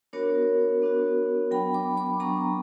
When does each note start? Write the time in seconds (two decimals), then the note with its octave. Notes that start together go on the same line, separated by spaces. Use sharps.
0.13 B3 D4 F#4 A#4 C#5
0.82 B3 D4 F#4
1.51 F#3 B3 D4 G5 B5
1.74 B5 D6
1.97 B5 D6
2.20 F#3 B3 D4 A#5 C#6